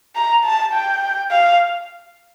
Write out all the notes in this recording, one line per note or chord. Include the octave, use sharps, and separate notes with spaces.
A#5
A5
G5
F5